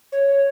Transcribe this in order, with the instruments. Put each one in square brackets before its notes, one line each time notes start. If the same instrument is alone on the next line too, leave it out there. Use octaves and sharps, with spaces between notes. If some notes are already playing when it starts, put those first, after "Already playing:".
[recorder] C#5